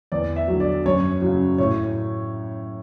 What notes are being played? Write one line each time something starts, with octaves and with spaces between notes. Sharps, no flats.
E2 D5
E5
F#3
D3
D5
F#2 C#5
C#3 F#3
A2 C#5